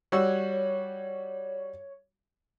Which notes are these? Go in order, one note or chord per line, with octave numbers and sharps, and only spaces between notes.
G3 F#4 C#5 E6